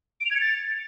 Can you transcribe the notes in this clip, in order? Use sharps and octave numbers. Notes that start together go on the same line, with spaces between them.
D7
F7
G#6
C#7
A6